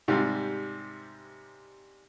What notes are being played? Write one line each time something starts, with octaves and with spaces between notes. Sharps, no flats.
G#2 C3 G3